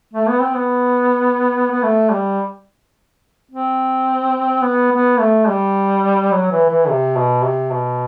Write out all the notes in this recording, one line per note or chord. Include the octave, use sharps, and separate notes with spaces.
A3
B3
C4
B3
B3
A3
G3
C4
B3
B3
A3
G3
F#3
E3
E3
C3
B2
C3
B2